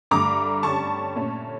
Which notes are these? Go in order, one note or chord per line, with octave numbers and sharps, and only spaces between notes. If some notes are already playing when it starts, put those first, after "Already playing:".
G2 D3 A3 A#5 D6
D3 G3 C#4 A5 C#6
A#2 A3 C#4